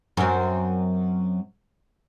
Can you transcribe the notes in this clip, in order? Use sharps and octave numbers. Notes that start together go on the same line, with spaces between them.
F#2 C4